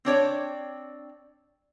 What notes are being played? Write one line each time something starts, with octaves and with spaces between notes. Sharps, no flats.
C4 D4 C#5 D5